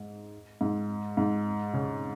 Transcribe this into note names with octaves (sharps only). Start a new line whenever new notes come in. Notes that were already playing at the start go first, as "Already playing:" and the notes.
Already playing: G#2
G#2
G#2
C#3